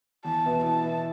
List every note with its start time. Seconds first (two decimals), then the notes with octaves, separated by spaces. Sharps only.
0.25 E2 A5
0.45 B2 B3 E4
0.63 E2 A5
0.83 B2 B3 E4